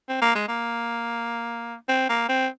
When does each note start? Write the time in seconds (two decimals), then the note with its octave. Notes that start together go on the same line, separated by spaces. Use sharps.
0.09 C4
0.21 A#3
0.35 G#3
0.48 A#3
1.88 C4
2.09 A#3
2.29 C4